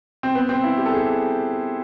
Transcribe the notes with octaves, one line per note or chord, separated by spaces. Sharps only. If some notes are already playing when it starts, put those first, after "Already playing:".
C4
B3
C4
E4
G4
A4
G#4